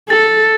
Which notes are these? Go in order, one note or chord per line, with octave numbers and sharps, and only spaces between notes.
A4 A6